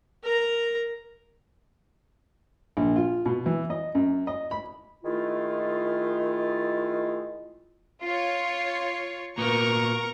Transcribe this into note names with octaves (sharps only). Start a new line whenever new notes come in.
A#4 A#5
A#1
F4
B2
E3
D#5
F#2
D#5
B5
D#3 G#3 A3 E4 F4
F4 C#5 C6
A#2 B3 A#4 A#5 C#6